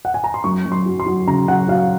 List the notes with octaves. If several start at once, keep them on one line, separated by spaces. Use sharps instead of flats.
F#5
G#5
A#5
C6
F#2 C#6
F#2
C6
F#3
C6
F#3
C#3 A#5
F#3 F#5
F#3 F5